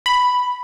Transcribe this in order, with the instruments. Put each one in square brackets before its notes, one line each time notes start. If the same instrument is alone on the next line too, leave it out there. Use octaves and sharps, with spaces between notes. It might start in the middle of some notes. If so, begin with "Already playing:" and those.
[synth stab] B5